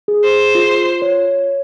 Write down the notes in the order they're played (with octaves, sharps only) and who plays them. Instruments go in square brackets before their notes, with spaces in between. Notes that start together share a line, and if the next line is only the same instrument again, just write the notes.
[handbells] G#4
[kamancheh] C5
[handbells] F4
C#5